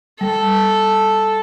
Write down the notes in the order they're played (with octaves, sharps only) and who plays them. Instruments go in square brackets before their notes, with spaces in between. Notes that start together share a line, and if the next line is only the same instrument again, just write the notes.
[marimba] G3 [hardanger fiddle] A4